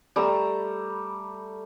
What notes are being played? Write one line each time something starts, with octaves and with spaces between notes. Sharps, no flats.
G3 A3 A#5 E6